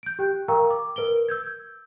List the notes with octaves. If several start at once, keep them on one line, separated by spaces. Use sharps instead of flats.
G6 D7
G4 G5 F#6
A#4 F5 G5 A#5 C#6 E6
D6
A#4 B4 D7 G7
E6 G6 G#6